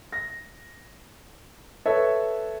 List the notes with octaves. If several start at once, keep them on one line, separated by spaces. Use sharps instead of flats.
A#6
A4 B4 C#5 E5